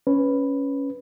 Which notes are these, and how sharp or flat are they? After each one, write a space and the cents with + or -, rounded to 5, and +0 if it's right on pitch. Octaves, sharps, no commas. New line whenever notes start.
C#4 +0 B4 +0